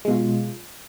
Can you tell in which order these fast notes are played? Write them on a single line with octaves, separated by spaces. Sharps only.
G#3 B2 F4